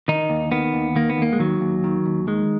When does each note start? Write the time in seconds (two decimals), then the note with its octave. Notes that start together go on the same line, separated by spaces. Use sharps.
0.08 D#3 D#4
0.30 D#2
0.52 D#3 B3
0.74 D#2
0.96 D#3 A#3
1.10 B3
1.18 D#2 A#3
1.33 G#3
1.39 D#3 F#3
1.61 D#2
1.84 D#3
2.06 D#2
2.27 D#3 G#3